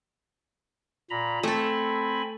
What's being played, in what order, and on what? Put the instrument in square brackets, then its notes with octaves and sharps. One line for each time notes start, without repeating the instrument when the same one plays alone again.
[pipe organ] A#2 A#5 B5
[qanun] A3 A4 [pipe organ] C4 G#5 B5